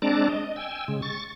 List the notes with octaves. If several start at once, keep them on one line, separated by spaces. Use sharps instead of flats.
G#3 C4 D4 D5 A5 A#5
D#5
G5 G#5 E6
C#3 G#3
C#6 A6